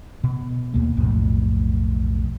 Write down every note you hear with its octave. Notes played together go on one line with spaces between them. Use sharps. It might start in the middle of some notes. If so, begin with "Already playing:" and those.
B2
D#2 A#3
B1 F2 A2